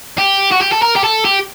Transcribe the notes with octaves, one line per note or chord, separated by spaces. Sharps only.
G4
F#4
G4
A4
A#4
G4
A4
G4